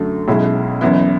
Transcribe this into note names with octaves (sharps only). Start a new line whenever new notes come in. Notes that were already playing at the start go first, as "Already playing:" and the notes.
Already playing: F#2 D3 F#3 A3
B1 B2 G#3 C#4 E4
F#1 F#2 E3 B3 E4